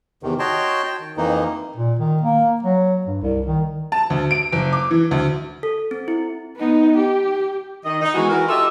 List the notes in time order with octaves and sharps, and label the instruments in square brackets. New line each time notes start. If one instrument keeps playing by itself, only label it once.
[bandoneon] E2 C3 D#3
F#4 C#5 D#5 G5 A5 C6
G5
D#3
F2 E3 A#3 D#4
[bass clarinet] A#2
D#3
A#3
F#3
G2
C2
D#3
[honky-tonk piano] A5
D2
D7
F#1
D6
E3
D2
[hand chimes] A4
C4
E4
[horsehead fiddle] B3 D#4
G4
[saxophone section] D#3 D#5
D#4
E3 G#3 B3 F#4
E3 F#4 A#4
F4 G4 A4 D#5 E5